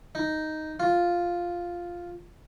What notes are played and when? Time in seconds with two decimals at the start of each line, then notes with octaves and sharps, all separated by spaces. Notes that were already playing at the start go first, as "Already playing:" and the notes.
0.15 D#4
0.80 F4